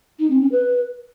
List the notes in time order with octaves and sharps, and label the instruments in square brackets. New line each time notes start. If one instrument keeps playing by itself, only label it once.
[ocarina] D#4
C4
C#4
B4